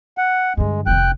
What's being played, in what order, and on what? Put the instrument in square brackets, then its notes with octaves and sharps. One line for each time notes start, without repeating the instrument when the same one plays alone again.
[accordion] F#5
[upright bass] G2 D3 [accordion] G#3
[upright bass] F1 D#3 [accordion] G5 F#6